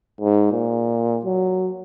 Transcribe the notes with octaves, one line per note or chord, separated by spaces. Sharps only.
G#2
A#2
F#3